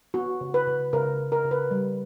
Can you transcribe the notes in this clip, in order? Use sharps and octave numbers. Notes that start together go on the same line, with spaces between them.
B3 F#4
C#3
B4
C#3
C#3 A#4
C#3
A#4
C#3
B4
G3